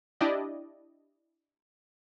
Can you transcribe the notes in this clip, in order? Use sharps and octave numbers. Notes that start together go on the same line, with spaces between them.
D4 E4 G4 D5 D#5